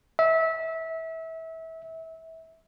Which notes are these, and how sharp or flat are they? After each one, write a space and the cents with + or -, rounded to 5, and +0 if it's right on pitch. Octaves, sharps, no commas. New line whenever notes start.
E5 -25